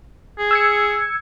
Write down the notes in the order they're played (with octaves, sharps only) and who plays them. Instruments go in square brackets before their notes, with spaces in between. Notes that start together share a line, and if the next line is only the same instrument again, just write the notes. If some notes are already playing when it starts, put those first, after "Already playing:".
[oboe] G#4
[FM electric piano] E6 G#6 C#7